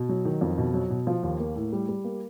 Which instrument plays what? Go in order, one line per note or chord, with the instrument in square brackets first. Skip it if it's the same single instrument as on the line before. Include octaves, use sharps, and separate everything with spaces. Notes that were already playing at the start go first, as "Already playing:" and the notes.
Already playing: [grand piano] B2
F#3
D#3
F2
B2
F#3
B2
F3
D#2
A#3
A2
G3
G3
A#3